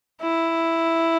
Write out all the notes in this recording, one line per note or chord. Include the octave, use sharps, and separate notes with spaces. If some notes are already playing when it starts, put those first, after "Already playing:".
E4